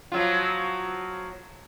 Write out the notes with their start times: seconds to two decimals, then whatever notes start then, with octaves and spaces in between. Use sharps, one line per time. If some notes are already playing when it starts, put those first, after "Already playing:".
0.12 F3 F#3 F4